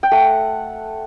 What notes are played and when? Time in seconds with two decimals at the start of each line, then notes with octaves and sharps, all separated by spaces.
0.03 G5
0.11 A3 F#5